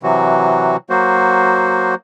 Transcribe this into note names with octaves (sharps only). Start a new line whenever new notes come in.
C3 E3 F#3 F#4
F#3 A#3 F#4 C5